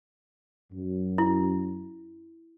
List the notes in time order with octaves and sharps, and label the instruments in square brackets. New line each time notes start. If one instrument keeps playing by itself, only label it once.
[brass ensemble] F#2
[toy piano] E4